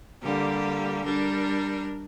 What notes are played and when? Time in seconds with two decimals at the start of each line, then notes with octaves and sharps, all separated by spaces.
0.23 D3 G3 A#3 G4
1.04 G3 D4 A#4